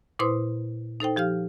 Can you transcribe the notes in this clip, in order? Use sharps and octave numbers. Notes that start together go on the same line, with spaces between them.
A#2 E4 B4 C5 C6 D#6
D#4 A4 C5 G5
F3 G4 F5 F6